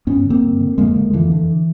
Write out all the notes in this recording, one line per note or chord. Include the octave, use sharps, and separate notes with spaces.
G2 B3 C#4
D3
A#3 C4
G2
D3
F2 G#3 A#3
D3
F2 D3 E3
D3